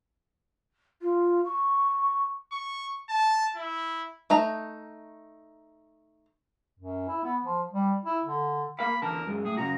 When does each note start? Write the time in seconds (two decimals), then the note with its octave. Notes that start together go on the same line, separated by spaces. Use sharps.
1.01 F4
1.45 C#6
2.52 C#6
3.10 A5
3.56 E4
4.30 A3 D#4 A#5
6.79 F#2
7.08 E4
7.23 B3
7.43 F3
7.72 G3
8.06 E4
8.24 D3
8.79 A#3 A#4 F5 B5
9.02 E2 D3 A#4 A5
9.27 F#2 G#3
9.45 A2 G#4
9.57 F#2 C#3 F#4 A#5